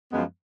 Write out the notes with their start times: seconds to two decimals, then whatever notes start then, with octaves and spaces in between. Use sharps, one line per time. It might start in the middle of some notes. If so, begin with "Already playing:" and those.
0.12 F#2 F3 G#3 B3